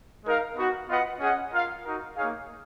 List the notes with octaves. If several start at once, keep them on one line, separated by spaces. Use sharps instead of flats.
G#3 D#4 A#4 F5
B3 D#4 F#4
B3 F4 B4 D#5 F#5
C#4 G#4 D#5 F#5
F4 A#4 F5
D#4 F#4 A#4
A#3 D#4 G#4 C#5 F5